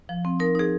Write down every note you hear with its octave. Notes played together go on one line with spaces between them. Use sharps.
F3
C4
D#4 A#4
D#4 G#4